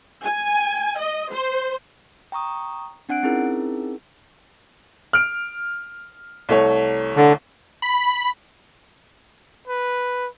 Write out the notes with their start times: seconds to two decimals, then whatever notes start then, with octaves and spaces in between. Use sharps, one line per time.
0.23 G#5
0.99 D#5
1.31 C5
2.32 G5 A#5 C#6 D#6
3.09 C4 D4 F#5 F#6 D7
3.23 C4 C#4 D#4 E4 G#4 A#4
5.13 F6 D7
6.49 C2 A3 C#5
7.15 D3
7.82 B5
9.67 B4